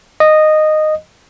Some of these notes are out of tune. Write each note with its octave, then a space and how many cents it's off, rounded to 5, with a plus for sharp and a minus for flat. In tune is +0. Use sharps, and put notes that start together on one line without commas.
D#5 -10